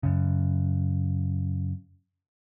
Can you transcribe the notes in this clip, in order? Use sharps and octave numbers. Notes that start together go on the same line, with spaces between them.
F#2 C#3